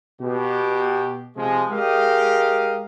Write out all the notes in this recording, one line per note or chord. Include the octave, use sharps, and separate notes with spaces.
B2 G4
C3 F3 G#3
G#3 G4 A#4 D#5 F5